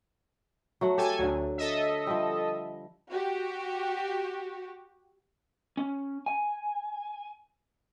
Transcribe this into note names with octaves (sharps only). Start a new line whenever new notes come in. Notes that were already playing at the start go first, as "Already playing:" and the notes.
F#3 A3 F#5
G4 A4 G#5
D2 D3 F#3
A4 D#5 E5
F3 G3
F#4 G4
C#4
G#5